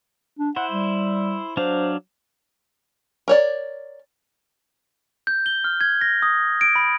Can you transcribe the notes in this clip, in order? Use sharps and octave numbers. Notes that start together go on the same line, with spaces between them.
D4
E4 C5 F#5
G3
F#3 D4 C5 F5
A#4 C#5 D5
G6
G7
F6
G#6
A#6
D#6
D7
B5